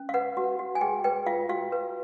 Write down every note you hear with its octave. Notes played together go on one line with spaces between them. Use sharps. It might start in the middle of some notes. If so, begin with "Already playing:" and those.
Already playing: C#4
F5
B4 F#5
F#4
F#4
G#5
G#4 G5
B4 G5
F4 F5
F#4 F5
B4